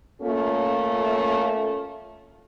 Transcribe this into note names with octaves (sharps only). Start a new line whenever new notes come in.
A3 A#3 C#4 F4 A4